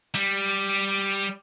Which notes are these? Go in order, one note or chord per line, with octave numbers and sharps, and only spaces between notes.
G3